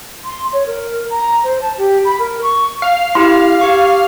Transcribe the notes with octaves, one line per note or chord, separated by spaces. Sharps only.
C6
C#5
A#4
A#5
C5
A5
G4
B5
A#4
C#6
F5
E4 G4 C6
G4 C#6